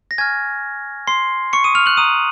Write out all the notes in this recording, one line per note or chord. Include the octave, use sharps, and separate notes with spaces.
A#6
G#5 C#6 F6 G#6
C6 C7
C#6 C#7
D#6 D#7
F6 F7
F#6 F#7
A#5 D#6 F6 D#7